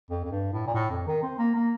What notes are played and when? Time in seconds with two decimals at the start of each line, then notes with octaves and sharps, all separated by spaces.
0.10 F2
0.25 F2
0.32 G2
0.53 A2
0.67 A#2
0.74 A2
0.91 F2
1.07 D#3
1.23 C4
1.39 A#3
1.55 A#3